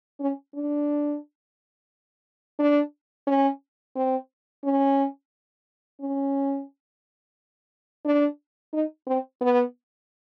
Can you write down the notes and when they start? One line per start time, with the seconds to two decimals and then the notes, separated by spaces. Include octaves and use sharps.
0.20 C#4
0.55 D4
2.59 D4
3.27 C#4
3.96 C4
4.64 C#4
6.01 C#4
8.05 D4
8.73 D#4
9.07 C4
9.41 B3